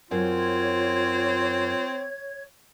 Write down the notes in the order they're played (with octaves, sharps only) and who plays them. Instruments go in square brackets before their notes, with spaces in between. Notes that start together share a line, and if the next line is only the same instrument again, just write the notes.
[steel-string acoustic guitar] F#2 [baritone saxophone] C4 [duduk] F4 [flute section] C#5 G#6